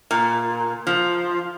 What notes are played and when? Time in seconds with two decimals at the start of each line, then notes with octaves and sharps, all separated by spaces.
0.11 A#2
0.87 F3